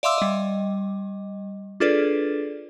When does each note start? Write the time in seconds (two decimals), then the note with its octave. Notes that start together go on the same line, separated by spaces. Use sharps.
0.03 D5 E5 F5 C6 D6 E6
0.18 G3 D#5
1.80 D4 F4 G#4 A4 B4 D5